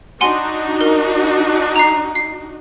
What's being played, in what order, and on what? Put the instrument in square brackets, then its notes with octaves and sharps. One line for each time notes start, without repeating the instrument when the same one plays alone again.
[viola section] D4 D#4 F#4 [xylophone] F#5 G#5 C6
[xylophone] A#4
A#5 C7
C7